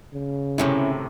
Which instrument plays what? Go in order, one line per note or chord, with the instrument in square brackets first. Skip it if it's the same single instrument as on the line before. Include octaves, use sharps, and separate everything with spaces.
[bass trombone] C#3
[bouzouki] A2 C3 D#3 [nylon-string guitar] C#4 E4